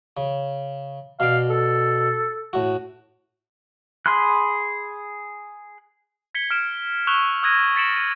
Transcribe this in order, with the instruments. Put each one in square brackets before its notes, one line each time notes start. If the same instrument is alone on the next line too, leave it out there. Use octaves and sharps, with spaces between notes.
[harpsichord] C#3
[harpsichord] B2 D5 [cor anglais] F5
[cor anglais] A4
[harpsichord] A2 F#4
[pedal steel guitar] G#4 B5 C6 F#6
[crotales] G#6 B6 C#7 G7
F6 D7 E7
C#6 E6 F#6 E7 F7 G7
D#6 E6 F#6 G#6 A#6 D#7
A6 B6 C#7 D7 E7 F#7
D#7